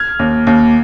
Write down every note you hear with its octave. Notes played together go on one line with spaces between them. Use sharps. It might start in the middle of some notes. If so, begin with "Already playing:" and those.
Already playing: F6 G#6
D#2
D#2